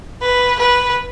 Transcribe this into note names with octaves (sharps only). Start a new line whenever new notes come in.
B4
B4